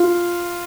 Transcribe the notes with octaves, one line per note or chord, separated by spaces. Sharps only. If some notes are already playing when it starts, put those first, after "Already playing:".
Already playing: F4